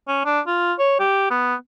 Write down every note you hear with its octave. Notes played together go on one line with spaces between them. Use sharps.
C#4
D4
F4
C#5
G4
B3